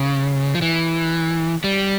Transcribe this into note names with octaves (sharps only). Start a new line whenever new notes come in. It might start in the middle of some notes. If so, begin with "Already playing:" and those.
Already playing: C#3
F3
E3
G3